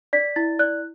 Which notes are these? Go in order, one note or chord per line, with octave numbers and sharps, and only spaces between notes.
D5 B6
E4 A6
D5 F#6